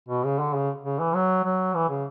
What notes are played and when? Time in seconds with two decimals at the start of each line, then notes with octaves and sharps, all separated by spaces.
0.09 B2
0.24 C#3
0.39 D3
0.54 C#3
0.83 C#3
0.99 E3
1.14 F#3
1.44 F#3
1.74 E3
1.89 C#3